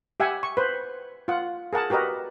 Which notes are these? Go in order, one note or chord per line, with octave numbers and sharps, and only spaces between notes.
G4 E5 F#5 G#5
C#6
B4 C5
F4 F#5
G#4 A#4 F#5 A5
F#4 G4 A#4 B4 D#5